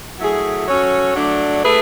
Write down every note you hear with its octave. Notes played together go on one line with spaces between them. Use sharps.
F#3 A3 E4 G#4
F#3 C#4 F#4 A4 C#5
F#3 A3 D4
A3 E4 G#4 B4